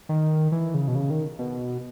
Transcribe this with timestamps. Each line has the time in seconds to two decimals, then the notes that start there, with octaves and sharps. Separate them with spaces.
0.09 D#3
0.52 E3
0.74 C#3
0.88 B2
0.95 C#3
1.10 D#3
1.39 B2